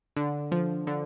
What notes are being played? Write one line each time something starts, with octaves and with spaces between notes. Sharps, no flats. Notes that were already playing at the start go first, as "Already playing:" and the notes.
D3
F3
D3